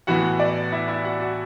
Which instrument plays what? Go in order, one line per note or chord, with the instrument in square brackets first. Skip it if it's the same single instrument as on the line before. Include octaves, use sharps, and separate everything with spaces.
[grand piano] A2 E3 B3 F#4 F#5
D5
E4 E5
E4 E5
F#4 F#5
F#4 F#5